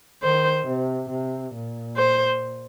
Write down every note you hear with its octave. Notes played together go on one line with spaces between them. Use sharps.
D#3 C5
C3
C3
A#2
C5